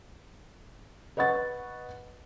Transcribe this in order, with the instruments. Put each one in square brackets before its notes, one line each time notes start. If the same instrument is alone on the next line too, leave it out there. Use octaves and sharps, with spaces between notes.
[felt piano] B4 D#5 F#5 C#6 A6